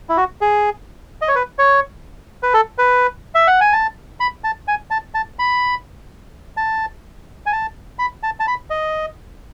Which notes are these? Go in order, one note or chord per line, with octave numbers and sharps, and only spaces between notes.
E4
F#4
G#4
D#5
C#5
B4
C#5
B4
A4
B4
E5
F#5
G#5
A5
B5
A5
G#5
A5
A5
B5
A5
G#5
A5
B5
A5
A5
B5
D#5